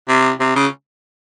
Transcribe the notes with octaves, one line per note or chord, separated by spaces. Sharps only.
C3
C3
C#3